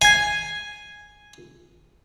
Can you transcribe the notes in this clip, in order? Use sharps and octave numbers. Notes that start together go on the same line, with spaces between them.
G#5 G#6 C7